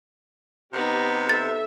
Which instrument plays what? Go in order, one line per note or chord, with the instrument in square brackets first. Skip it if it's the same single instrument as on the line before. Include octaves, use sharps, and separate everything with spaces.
[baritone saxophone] C3 [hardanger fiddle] B3 D#4 [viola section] G4
[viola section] A4 E5 [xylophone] A6